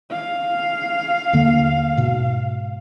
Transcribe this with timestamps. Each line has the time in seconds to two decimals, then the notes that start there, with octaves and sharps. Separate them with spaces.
0.12 F5
1.33 D#2 D3 A#3
1.97 G#2 B2